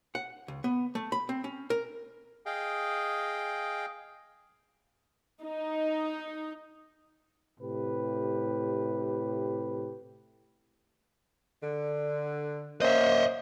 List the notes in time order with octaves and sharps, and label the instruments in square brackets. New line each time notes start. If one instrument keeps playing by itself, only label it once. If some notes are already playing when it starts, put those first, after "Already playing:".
[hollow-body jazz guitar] F#5
C#2
B3
A3
B5
C4
C#4
A#4
[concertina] G#4 D#5 F5 G5
[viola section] D#4
[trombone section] A2 C3 G4 B4
[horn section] D3
[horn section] A#3 C#4 C5 [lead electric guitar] D#5 E5